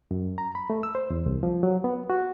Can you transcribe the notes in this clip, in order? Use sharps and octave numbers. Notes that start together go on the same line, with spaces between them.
F#2
A#5
B5
A3
E6
C5
E2
C2
F3
F#3
B3
F#4